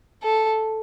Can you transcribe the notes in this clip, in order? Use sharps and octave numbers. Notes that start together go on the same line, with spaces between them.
A4